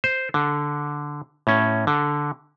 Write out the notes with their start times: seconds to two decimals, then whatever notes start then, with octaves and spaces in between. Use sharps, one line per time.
0.04 C5
0.34 D3
1.47 A2 C#4
1.87 D3